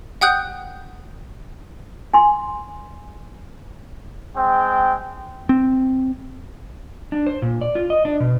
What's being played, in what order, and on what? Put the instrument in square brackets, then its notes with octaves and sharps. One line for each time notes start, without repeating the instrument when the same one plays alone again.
[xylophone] F#5 G5 D#6 F#6 G6
[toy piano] G#5 C6
[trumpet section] G#3 C4 G5
[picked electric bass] C4
[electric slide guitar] D4
C5
A#2
D5
F4
D#5
D4
B2